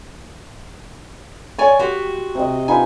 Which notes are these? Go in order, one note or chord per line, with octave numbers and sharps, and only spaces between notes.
C#5 D5 G#5 C#6
F#4 G4 C6
C3 D#5
D#4 F4 B4 G#5